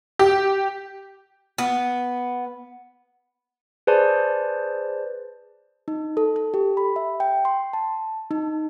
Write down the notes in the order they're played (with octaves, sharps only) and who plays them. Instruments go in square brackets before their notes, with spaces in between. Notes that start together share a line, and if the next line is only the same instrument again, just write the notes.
[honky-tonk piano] G4
[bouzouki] B3
[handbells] G#4 B4 C5 D5 A5
[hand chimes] D#4
A4
A4
G4
B5
E5
G5
C6
A5
D#4